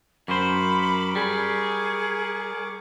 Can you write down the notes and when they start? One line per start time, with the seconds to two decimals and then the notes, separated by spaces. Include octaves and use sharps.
0.28 F#2 A#4 C5 B5 C#6 D6
1.15 G3 G#4